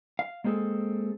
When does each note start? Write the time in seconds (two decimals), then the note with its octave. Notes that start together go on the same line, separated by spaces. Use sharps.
0.19 F5
0.44 G#3 A#3 C4 G#4 A4